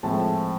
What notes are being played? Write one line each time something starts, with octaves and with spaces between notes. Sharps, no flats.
A2 F3 G#3 C4 A5